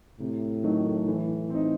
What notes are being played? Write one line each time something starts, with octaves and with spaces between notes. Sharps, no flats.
A2 C3
D#3 F#3 A3 D#4
E3
C4 D#4